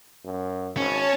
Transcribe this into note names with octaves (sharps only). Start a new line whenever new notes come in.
F#2
G#1 C#4 C#5 A5